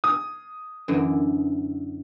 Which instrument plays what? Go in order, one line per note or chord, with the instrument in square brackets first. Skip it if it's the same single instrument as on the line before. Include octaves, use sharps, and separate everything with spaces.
[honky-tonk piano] D#6
[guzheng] F#2 D3 E3